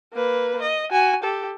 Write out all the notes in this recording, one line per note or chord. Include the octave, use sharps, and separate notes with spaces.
A#3 B4
D#5
F#4 G#5
G4 A4